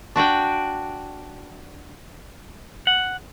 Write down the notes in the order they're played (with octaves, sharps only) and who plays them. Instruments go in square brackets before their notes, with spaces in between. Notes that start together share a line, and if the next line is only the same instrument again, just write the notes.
[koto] D4 F#4 D5 G5
[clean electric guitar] F#5